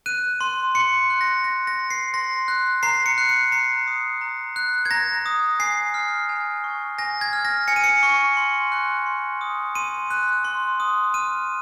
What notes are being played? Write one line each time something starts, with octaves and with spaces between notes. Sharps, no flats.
F#6 D#7
C6
C6 C#7
F#6
A#6
F#6 A#6
A#6
C6
C7
C6 A#6
F#6
A#5 C7
C#7
F#6
C#7
A#5 C7
D#6
A#5
F#6
G#6
A#5 A#6
D#6
G#5 C7
F6
G#5
C#6
G#5 A#6
G#6
F6
A#6
G#5 C#7
D#7
C#7
C#6
C6
F#6
C6
D#6
C6 D#7
F#6
C6
D#6
F6 D#7